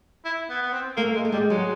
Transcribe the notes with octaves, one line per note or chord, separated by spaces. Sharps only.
E4
B3
B3
C4
A3 A#3
G#3 A3
A3
G3 G#3
F#3 G#3